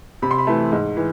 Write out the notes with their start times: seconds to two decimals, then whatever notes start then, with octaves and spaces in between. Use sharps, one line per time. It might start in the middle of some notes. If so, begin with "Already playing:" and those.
0.22 C3 B5
0.31 C6
0.38 B5
0.47 E3 A3
0.72 G#2
0.97 E3